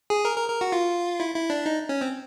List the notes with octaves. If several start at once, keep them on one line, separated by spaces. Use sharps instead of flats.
G#4
A#4
A#4
A#4
F#4
F4
E4
E4
D4
D#4
C#4
C4